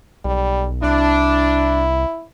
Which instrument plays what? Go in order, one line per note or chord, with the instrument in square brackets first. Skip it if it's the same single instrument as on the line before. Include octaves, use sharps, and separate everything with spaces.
[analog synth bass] B1 [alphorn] G3
[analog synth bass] C2 [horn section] D4 [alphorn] E4